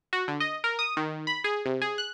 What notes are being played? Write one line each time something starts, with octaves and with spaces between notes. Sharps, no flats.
F#4
D3
D#5
A#4
D#6
D#3
B5
G#4
C3
G#4
F#6